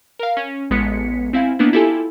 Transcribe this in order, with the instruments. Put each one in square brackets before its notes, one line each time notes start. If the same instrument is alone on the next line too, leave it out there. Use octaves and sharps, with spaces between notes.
[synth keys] A#4 F5
C#4
A1 G#3 B3 B6 C#7
C4 E4 F5 G#5
A#3 B3 D4 E4
E4 F4 G4 A4 G#5